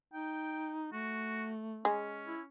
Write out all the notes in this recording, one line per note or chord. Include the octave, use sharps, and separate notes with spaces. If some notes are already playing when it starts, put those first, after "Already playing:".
D#4 G5
A3 F#4
G#3 C#4
E4